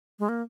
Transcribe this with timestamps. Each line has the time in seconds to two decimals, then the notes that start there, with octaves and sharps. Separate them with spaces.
0.20 G#3
0.29 A#3